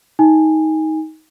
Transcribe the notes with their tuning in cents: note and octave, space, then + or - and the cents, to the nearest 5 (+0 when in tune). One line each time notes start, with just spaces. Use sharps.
D#4 +20 G#5 -20